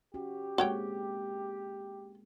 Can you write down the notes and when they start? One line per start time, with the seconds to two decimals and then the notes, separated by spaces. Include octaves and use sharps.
0.14 C#4 F#4 G4
0.58 G#3 A#3 C4 F#4 C#5 G5